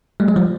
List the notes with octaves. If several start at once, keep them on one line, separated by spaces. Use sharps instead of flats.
G3 A3
F#3 G#3
F3 G3